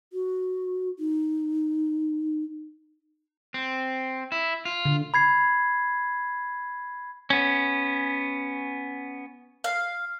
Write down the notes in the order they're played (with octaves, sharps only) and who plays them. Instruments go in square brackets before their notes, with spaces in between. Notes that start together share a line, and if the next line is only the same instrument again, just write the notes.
[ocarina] F#4
D#4
[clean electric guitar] C4
E4
F4
[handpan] D3
[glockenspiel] B5 G#6 C7
[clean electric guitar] B3 C#4
[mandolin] F5